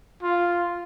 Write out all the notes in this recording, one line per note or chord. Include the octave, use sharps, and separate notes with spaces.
F4